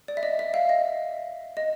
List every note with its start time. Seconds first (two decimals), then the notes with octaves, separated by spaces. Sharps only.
0.08 D5
0.17 E5
0.23 D#5
0.39 E5
0.54 F5
0.69 D#5
1.57 D#5